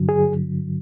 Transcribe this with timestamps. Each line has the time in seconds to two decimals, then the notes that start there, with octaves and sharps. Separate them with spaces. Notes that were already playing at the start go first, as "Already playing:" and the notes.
Already playing: G2 D3 F#3
0.09 G#4